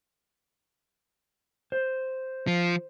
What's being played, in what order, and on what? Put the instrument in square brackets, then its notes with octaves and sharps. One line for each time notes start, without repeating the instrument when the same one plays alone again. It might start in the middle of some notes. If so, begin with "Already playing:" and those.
[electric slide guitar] C5
[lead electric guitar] F3